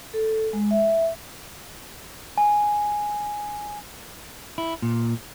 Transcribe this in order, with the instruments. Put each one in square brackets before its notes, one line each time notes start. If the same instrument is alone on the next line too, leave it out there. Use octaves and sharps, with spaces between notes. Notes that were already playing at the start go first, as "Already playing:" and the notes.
[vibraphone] A4
G#3
E5
[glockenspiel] G#5
[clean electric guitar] E4
A#2